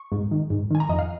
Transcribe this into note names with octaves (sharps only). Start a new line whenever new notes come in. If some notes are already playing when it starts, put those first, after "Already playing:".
Already playing: C#6
G#2
D#3
G#2
D#3 G#5
A#5
F2 D#5
F5